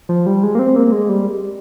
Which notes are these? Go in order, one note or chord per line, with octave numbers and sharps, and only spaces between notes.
F3
G3
G#3
A#3
C4
A#3
G#3
G3